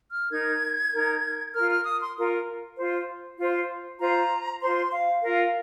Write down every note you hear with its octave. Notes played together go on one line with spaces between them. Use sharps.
F6
D#4 A#4 G#6
D#4 A#4
F4 A#4 F6
F6
D#6
C6
F4 A#4
F4 C5
F4 C5
F4 C5 A#5
F4 C5 C6
F5
F4 A#4 F5